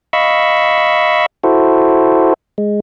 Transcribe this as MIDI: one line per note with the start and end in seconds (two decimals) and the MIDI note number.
0.13 1.26 75
0.13 1.26 77
0.13 1.26 83
0.13 1.26 85
0.13 1.26 88
1.44 2.34 64
1.44 2.34 66
1.44 2.34 69
1.44 2.34 72
2.58 2.80 56